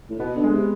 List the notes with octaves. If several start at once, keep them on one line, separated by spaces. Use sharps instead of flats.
A2
B2 B3
D3
G#3
C3